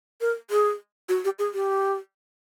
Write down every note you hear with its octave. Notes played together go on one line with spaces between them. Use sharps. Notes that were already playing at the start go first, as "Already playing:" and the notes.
A#4
G#4
F#4
G4
G#4
G4